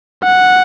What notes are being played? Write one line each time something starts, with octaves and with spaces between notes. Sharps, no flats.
F#5